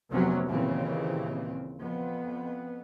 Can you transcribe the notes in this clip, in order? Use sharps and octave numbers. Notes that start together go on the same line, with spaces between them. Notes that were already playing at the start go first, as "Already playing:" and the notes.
F1 D2 C3 F#3 B3 C#4
D#2 A#2 C#3 E3 C4
F2 B3